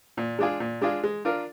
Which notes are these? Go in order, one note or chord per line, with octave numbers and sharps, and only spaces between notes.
A#2
G#3 D4 F4 G#4
A#2
G#3 D4 F4 G#4
G#3
D4 F4 A#4